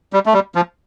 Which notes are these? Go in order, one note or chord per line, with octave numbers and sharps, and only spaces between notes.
G3
A3
G3
F3